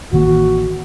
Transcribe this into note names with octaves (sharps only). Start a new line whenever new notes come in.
A1 D#3 A#3 F#4